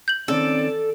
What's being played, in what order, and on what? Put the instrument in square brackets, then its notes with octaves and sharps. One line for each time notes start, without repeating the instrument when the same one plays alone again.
[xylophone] G6 F#7
[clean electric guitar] D#3 C4 C#4 [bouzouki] A4 [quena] D5